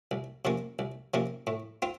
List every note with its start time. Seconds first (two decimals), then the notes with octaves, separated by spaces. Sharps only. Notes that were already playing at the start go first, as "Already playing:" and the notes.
0.11 C2
0.45 C3 F3 A#3 C#4
0.79 C2
1.14 C3 F3 A#3 C#4
1.47 A2
1.82 C4 F4